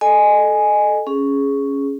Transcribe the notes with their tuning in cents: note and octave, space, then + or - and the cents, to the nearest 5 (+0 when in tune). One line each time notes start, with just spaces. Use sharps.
A4 -15 D#5 -20 G#5 +0
C#4 +0 G#4 +0